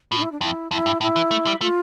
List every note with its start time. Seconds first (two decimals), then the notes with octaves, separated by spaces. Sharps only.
0.12 A2 F4
0.17 D4
0.22 E4
0.32 D4
0.41 F2 E4
0.71 F2 E4
0.86 G2
1.01 A2 E4
1.16 E3
1.31 A3
1.47 G3
1.61 A3 F4